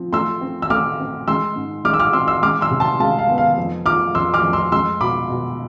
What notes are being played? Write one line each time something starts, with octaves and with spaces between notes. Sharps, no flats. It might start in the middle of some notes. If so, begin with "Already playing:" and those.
Already playing: F3 C4
A3 C6 E6
C4
E6
A3 D6 F6
C4
G#3 C6 E6
G#2
G#3 D6 F6
E6
D6 F6
C4 C6 E6
C6 E6
G#3 D6 F6
C6 E6
C3
A5 C6
G#3 F5 A5
F5
B3
F5
F2
F3 D6 F6
F2 C6 E6
D6 F6
F2
C6 E6
G#3 C6 E6
B2 B5 D6
B2